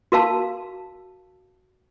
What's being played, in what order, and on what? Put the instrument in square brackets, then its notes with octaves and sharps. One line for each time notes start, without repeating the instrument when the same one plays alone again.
[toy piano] F#4 A#4 F5 A5